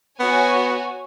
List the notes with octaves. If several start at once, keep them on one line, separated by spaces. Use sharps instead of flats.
B3 F#4 C#5 G#5